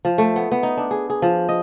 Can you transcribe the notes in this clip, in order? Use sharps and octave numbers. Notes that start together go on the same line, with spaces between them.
F3
A3
B3
B3
D#4
D4
G#4
G#4
F3
D#5